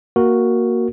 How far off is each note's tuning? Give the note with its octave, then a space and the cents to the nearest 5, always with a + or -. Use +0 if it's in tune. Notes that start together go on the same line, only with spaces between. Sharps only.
A#3 +0 F#4 +0 A#4 +0